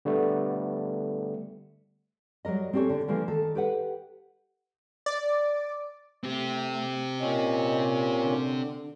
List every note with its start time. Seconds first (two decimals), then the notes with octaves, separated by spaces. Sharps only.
0.05 D3 G3 A3 B3
2.45 F#3 G3 A#4 D#5
2.73 C4 C#4 G4 A4 C#5
2.90 D3
3.08 D3 E3 F3 A3 A#3
3.28 D#3 A4
3.55 G4 B4 F#5
5.06 D5
6.24 A3 C4 G4
7.20 A#2 C#4 D#5
8.23 D3